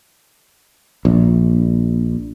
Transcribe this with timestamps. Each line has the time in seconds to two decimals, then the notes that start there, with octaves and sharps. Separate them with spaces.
1.05 A#1